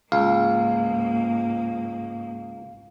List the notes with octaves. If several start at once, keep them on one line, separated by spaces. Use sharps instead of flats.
C#2 G#2 A#3 F5